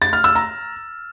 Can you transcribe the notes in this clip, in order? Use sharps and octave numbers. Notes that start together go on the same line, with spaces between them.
A6
F6
E6
A#5